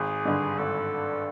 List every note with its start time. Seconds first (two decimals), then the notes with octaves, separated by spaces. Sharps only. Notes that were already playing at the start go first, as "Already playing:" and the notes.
Already playing: G#1 G#4
0.25 G2 D3
0.59 G#1 A4